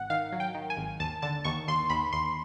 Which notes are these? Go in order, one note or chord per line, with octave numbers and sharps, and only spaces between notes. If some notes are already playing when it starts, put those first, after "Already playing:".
Already playing: G#1 F#5
D#3 F5
F#3
G5
D#3
G#5
G#1
D#2 A5
D3 A5
D#2 C#6
D#2 C6
D#2 B5
D#2 C6